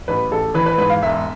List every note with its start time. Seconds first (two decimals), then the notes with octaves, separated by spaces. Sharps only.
0.08 A1 B4
0.31 A1 A4
0.54 E3 B4
0.66 B4
0.78 G#2 B4
0.90 F5
1.02 E1 E5